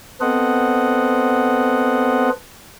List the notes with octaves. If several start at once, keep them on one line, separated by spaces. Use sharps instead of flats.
B3 C4 A4 C5 D#5 F#5